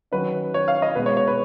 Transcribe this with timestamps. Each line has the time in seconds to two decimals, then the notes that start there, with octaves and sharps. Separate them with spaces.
0.12 D#3 F#3 C#4 B4
0.54 C#5
0.68 F5
0.82 D#5
0.95 B2 G#3 B3 B4
1.06 C#5
1.17 C#5
1.28 B4